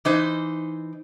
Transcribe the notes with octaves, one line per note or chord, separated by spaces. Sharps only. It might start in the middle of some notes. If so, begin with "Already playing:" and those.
E3 D#4 C5